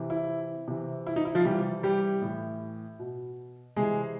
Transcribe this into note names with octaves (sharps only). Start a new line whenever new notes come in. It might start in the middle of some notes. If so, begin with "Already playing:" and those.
Already playing: C3 E3
E4
C3 E3
E4
D#4
E4
F3 F4
C3 E3 G3 G4
G3 G4
A2 E3
B2
C3 E3 G#3 G#4